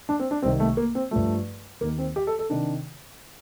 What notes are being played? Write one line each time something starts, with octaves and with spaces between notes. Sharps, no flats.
D4
C4
D4
C2 C3 D#3 C4
A3
A#3
C4
G2 F3 A3
D#2 D#3 A#3
C4
G4
A4
A4
C3 D#3 D4